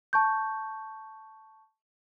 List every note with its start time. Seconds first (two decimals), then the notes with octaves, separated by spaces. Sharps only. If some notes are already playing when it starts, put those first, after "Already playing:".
0.13 A5 C#6 G6